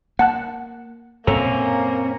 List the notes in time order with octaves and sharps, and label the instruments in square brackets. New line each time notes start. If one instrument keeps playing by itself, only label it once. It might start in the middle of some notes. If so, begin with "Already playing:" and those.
[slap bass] A#3 [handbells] F#5 A5 F#6
[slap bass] F#2 A#2 [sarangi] A#3 [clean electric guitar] C4 C#4 A#4 [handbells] A4